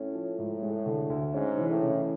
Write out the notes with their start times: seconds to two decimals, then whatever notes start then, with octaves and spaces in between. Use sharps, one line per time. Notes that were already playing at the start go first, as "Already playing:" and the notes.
Already playing: A2 C#4
0.15 F3
0.38 G#2
0.62 G#3
0.86 D3
1.10 D2
1.33 G#2 C#4
1.57 E3
1.69 A2
1.82 C#3